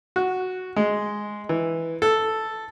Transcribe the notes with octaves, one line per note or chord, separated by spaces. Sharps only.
F#4
G#3
E3
A4